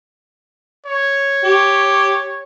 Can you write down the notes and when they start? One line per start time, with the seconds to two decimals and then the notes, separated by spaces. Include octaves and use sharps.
0.86 C#5
1.44 G4